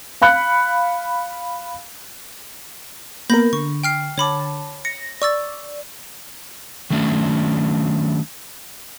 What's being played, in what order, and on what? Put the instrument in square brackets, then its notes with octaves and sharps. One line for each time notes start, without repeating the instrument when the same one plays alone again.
[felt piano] F5 B5 F#6 C#7
[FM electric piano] A#3 B3 A#4 [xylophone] B5 G6 A#6
[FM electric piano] D3 [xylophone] C#6
[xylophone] G5 F6 C7
[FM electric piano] D3 A5 [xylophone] C#5 B5 D6
[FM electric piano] A#6 [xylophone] C#7
[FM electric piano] D5 [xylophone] C#6 E6 A6
[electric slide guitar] D#3 F#3 A3 C#4 D4